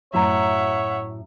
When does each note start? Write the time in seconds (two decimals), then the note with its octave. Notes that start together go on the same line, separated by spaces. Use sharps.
0.13 F#2 A2 E4 F#4 C#5 E5 F#5 A#5